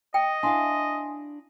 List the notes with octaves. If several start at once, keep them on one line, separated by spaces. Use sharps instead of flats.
D#5 G5
D4 E4 F5 G#5 C6